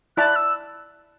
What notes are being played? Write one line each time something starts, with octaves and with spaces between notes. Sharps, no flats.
E4 D5 A5 F#6
E6